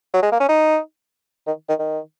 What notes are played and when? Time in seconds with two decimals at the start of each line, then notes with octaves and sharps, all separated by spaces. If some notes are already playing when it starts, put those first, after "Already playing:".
0.14 F#3
0.22 G#3
0.32 A#3
0.40 C#4
0.49 D#4
1.47 D#3
1.69 D#3
1.79 D#3